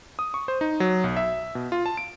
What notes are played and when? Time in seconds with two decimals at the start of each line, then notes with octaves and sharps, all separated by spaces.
0.19 D#6
0.34 C#6
0.48 C5
0.61 D#4
0.80 F#3
1.04 B1
1.17 E5
1.55 B2
1.72 F4
1.86 A5
1.97 D7